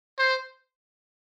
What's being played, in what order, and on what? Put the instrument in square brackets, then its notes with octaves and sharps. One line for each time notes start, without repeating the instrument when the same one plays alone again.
[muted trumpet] C5